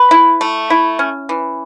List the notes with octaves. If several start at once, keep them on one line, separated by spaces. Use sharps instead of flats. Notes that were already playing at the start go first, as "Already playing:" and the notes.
Already playing: B4
E4
A3
E4
C#4
E3